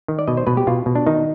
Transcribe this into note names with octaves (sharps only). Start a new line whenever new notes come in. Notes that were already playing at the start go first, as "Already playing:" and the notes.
D#3
D5
B2 D#5
C5
B2 B4
G4
B2 F4
B2
D4
D#3 D#4